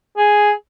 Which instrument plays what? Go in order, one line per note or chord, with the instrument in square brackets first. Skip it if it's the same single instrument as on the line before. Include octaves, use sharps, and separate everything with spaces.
[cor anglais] G#4